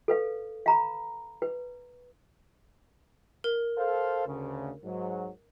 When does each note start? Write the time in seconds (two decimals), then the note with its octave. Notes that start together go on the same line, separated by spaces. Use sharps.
0.08 A4 B4 F5
0.66 F5 A#5 B5
1.42 B4
3.44 A#4
3.77 A4 C5 F5
4.26 D2 C#3
4.85 G#2 F#3